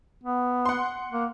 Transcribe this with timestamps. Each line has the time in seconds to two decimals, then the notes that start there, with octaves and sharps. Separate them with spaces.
0.24 B3
0.66 F#5 C6
1.12 A#3